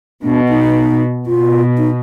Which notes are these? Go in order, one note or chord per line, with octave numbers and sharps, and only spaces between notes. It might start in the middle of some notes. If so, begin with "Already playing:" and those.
B2 D4
D#4
B2 F4
D#4